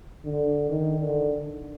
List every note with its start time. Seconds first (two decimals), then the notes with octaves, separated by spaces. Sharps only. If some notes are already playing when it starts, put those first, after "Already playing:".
0.25 D3
0.70 D#3
1.00 D3